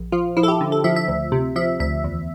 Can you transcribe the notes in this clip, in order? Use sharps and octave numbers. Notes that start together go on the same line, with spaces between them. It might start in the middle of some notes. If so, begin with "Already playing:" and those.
Already playing: A#1
F3 F4
F3 E4
A4
G4
D3
A4
F3 E5
E5
D2
C3
F3 E5
D2 E5
E2